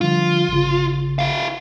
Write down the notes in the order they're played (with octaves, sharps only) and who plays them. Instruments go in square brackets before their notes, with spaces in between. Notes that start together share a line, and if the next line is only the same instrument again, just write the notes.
[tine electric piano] D3 F3 G3 [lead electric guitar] F4
[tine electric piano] G#1 C#3
[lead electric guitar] E4 F5